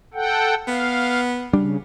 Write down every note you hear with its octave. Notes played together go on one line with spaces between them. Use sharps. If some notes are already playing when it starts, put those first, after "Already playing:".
A4 F#5 G5
B3 F5
C#3 G3 D4